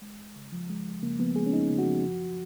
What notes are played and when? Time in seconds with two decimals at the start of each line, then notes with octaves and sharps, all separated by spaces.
0.02 G#3
0.19 F2
0.36 C#3
0.52 F3
0.69 G#3
0.86 F2
1.02 C#3 A#3
1.19 F3 B3
1.36 G#3 G#4
1.46 C#4
1.53 F2 D#4
1.70 C#3
1.79 F#4
1.87 F3
2.04 F#2